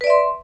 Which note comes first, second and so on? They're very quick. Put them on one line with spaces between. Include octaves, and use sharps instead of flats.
B4 D5 E5 C6